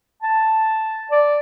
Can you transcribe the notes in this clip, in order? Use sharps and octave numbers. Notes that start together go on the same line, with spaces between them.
A5
D5